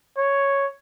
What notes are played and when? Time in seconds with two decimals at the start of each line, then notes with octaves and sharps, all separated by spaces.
0.18 C#5